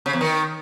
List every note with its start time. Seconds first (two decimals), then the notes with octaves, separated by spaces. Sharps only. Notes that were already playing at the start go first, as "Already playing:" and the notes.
0.06 C#3
0.13 E2
0.21 D#3